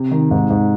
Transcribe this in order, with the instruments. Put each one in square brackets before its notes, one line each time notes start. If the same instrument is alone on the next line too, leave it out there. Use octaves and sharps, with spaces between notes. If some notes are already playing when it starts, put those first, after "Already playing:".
Already playing: [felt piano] C3
[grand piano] D#3
G#2
G#2